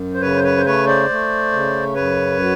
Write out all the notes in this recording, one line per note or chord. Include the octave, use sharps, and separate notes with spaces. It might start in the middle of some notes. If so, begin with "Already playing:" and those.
Already playing: F#2
C5
C#3 B4 C#5
C5
B4 C#5
C5
A3 B4 C#5
C5 D5
A3
C#3
F#2 B4 C#5
F#3